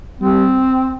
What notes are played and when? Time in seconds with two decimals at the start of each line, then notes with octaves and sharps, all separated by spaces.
0.21 G3 C4